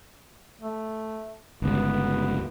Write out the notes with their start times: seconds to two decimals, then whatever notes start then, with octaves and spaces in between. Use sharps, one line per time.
0.61 A3
1.62 G1 C#2 B3